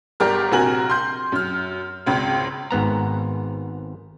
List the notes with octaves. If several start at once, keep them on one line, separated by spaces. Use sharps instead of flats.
G1 G4 A#4 D5 F6
A#1 C3 F#4 A#4 G#5 F#7
C6 G6
F#2 F6
G#1 C#2
G#1 G#2 B3 A#5